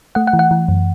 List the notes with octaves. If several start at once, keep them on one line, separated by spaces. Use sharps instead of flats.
A3 F#5
F#5
E3
F#5
E3
F#2